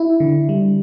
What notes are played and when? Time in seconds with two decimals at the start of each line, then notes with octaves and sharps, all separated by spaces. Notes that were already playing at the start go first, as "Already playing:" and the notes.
Already playing: E4
0.20 D3
0.49 G3